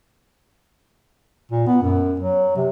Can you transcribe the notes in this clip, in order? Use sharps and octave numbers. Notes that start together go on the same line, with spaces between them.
A#2
B3
F#2
F#3
C3